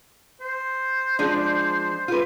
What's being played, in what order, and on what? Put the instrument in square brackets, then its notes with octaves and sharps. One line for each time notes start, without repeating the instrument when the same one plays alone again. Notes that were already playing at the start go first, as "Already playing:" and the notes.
[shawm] C5
[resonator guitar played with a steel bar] F3 G#3 D4
F4 B4